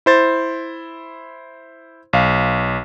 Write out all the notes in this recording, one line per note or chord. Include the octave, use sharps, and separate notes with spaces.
E4 C5 A6
B1 F5